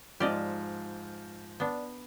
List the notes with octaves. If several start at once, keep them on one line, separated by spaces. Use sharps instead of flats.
G#2 F3 G4 D5 D#5 F6
B3 D4